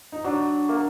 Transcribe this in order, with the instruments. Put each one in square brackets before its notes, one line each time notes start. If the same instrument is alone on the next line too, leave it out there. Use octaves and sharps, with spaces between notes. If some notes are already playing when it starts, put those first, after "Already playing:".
[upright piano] D#4
[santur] F#3 [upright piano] D4
[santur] A#3